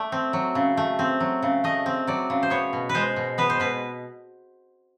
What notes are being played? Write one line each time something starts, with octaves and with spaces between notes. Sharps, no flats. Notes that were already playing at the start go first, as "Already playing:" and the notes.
Already playing: A3 D5
C4
F#3
C#3
A3
C4
F#3
C#3
A3 D#5
C4
F#3 D5
C#3
C5
B3 C#5
B2
B4
G#3 C5
B2
B3 B4
C5
B2 B4